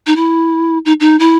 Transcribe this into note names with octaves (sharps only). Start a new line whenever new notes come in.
D#4
E4
D#4
D#4
E4